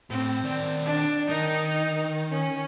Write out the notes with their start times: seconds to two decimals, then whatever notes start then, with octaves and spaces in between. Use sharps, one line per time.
0.10 A2 C4
0.43 D#3 D5
0.86 D4
1.29 D#3 D#4
2.31 C#4